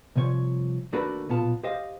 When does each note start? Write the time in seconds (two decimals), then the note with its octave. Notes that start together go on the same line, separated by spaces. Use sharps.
0.16 C2 C3 F3 C#5
0.93 D#2 A3 D4 F#4 A#4 B4
1.29 B1 A#2 B3 F4 A5
1.63 G4 C5 D#5 F5